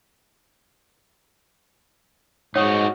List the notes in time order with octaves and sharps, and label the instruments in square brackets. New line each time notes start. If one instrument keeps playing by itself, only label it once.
[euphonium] G#2 [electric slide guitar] D#4 F#4 [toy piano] C#5 F#5 D#6